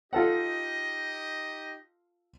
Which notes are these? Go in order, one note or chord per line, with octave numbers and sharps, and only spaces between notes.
D#4 F4 G4 A4 D#5 F#5